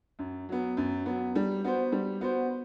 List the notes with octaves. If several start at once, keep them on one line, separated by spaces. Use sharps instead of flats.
F#2
F#3 B3
F#2
F#3 B3
G3
B3 F#4 C5
G3
B3 F#4 C5